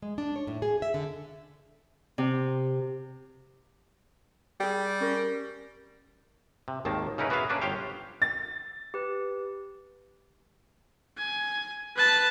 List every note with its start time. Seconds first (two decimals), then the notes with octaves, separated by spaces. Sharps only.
0.02 G#3
0.18 D4
0.36 C#5
0.47 A2
0.62 G#4
0.82 E5
0.94 D3
2.18 C3
4.60 G3 G#4 G5
5.00 C#4 A#4
6.68 C3
6.85 G#1 D#2 D#3 A#3 A5
7.18 C#3 C#4 D#4 E4 A#4 B4
7.30 B3 F#4 G#4 B4 E5 F5
7.49 A#3 C#4 D4 B4 D5
7.61 G1 G4 C5 C#5 F5 G5
8.22 A6
8.94 G4 B4
11.18 G#5
11.97 B4 A5